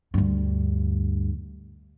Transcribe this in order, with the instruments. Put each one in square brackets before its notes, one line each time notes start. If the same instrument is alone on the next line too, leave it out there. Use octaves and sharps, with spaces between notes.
[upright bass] D2 G2